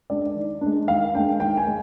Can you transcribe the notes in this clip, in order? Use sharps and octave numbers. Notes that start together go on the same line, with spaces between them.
G#3 D4 D5
D#3
G#3 D4
D#3 F5
G#3 D4 G5
D#3 G5
G#5
G#3